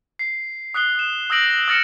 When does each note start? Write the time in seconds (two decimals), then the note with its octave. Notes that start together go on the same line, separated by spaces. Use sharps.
0.19 C7
0.74 D#6 F#6 B6 C7 G7
0.99 E7
1.30 D#6 E6 G6 A#6 D7 F#7
1.68 D#6 F6 A6 A#6 C#7 E7